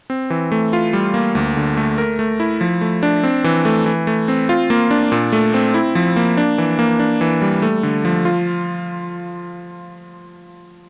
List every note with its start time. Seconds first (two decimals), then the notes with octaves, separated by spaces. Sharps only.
0.10 C4
0.30 E3
0.52 A3
0.73 F4
0.93 G3
1.14 A#3
1.35 D2
1.57 D3
1.77 A3
1.98 A#4
2.19 A3
2.40 E4
2.61 F3
2.81 A3
3.03 D4
3.23 C4
3.44 E3
3.65 A3
3.86 E3
4.07 A3
4.28 C4
4.49 F4
4.70 A#3
4.91 D4
5.12 A#2
5.33 A3
5.54 C4
5.74 E4
5.95 F3
6.16 A#3
6.37 D4
6.58 E3
6.79 A#3
6.99 D4
7.21 E3
7.42 G3
7.62 A3
7.83 D3
8.05 F3
8.25 F4